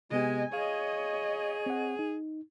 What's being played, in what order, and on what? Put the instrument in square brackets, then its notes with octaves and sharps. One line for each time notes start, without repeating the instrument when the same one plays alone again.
[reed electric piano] C3 B3 G4 [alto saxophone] G#3 [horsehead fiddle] D#5 G#5
[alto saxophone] G#4 [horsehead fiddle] C#5 D#5 [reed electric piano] F5
[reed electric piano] C4 F#5
D#4